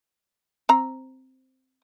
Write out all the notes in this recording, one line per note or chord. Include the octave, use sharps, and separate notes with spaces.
C4 A#5